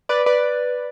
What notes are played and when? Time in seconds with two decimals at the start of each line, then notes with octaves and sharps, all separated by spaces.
0.09 B4 D5
0.26 B4 D5